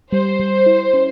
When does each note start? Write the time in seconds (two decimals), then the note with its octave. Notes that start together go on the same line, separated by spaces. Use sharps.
0.12 G3 C5
0.40 G3
0.66 E4
0.94 C#4